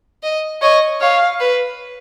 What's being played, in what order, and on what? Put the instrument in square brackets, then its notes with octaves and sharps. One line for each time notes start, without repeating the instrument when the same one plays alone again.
[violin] D#5
[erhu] C#5 [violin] D#5
[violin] C#5 [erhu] F5
[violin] B4